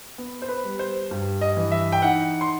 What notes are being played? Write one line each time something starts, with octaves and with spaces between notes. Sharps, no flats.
B3
C5
B4
G3
C5
G2
D#5
E3
E5
G5
D#4 F#5
C6